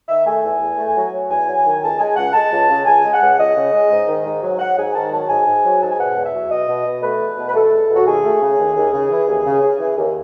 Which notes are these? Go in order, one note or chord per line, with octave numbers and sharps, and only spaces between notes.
D#3 E5
A3 G#5
E2
E2
A3
F#3
F#3
E2 G#5
F#3
D#3
C#2 A5
G#3 G#5
C#2 F#5
G#3 A5
C#2
C#3
C#2 G#5
G#3
F#5
C#2
C#2 D#5
C#3
G#3
G#2
D#3
G#2
F#3
F#3 F#5
G#2 G#5
D#3 A5
F#3 A5
G#2 G#5
G#2
F#3
G#2 A5
G#5
B2 F#5
E2
E5
F#3
B2 D#5
B2
B2
A3 B4
E2
B2
B4
A3 A4
E2
B2
F#4
D#2 G#4
A3
C#3
D#2
D#2
C#3
E3
D#2
C#3
C#3
E3
D#2